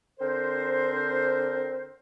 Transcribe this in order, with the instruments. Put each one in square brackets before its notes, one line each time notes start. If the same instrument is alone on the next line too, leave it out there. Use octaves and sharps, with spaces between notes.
[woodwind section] D3 C4 A#4 C5